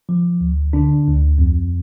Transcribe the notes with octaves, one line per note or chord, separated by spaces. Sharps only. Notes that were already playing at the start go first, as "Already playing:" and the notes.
F3
D2
D3 D4
D2
F2